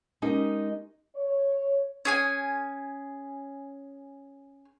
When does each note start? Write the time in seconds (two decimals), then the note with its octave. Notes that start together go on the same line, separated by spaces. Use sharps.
0.22 G#3 C#4 D#4 G4 A#4
1.16 C#5
2.05 C#4 G#4 G#5